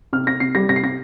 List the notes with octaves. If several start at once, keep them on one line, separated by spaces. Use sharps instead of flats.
C3 F6
C3 A#6
C3 C7
G3 A#6
C3 A#6
C7
C3 A#6